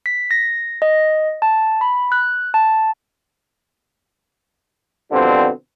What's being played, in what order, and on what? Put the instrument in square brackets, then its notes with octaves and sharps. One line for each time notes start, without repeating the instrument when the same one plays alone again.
[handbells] B6
A#6
D#5
A5
B5
F#6
A5
[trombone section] B2 D3 F3 G3 C4